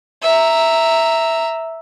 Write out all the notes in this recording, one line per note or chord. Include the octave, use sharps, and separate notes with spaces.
E5 A#5